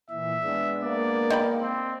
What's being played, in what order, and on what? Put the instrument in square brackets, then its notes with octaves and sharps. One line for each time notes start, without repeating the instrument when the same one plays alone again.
[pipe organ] A#2 E3 [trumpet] E5
[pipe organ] G#3 B3 D4
[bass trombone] A#3 [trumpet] D5
[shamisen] D#4 G5 B5
[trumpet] C4